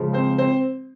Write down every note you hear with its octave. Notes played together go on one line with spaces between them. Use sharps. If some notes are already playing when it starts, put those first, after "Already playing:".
Already playing: C#3 F3 G#3
C4 C5
C4 C5